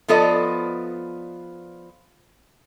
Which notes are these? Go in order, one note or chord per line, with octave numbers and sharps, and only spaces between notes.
F3 B3 F4 A4 D5 D#5